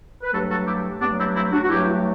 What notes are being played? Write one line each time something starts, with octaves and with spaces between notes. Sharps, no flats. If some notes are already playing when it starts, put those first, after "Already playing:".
B4
G2 F#3 A3 F#4 A4
F#4 A4
E4 G4
G2 F#3 A3 B3 D4
C4 E4
C4 E4
D4 F#4
F#4
G2 F#3 A3 E4 G4